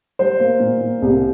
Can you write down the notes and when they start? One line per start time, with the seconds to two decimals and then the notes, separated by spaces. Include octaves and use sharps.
0.19 G3 C5
0.40 A#3
0.60 A#2
0.81 A#2
1.02 C2